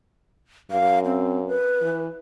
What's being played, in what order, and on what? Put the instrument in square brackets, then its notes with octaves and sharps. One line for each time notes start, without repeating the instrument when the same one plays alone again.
[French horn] F#2 [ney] F5
[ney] C4
B4
[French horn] E3